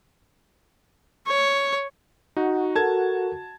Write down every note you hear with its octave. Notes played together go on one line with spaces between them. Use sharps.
C#5
D#4 F#4
A4 A#4 A5 G#6